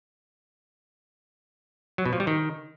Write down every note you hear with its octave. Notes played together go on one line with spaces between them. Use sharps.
F#3
B2
F3
G3
D#3